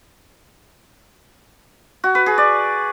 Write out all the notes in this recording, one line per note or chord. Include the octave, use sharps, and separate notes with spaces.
F#4
B4
G#4
D5